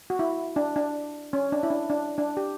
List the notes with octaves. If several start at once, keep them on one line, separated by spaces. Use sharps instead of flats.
F#4
E4
D4
D4
C#4
D4
E4
D4
D4
D4
G4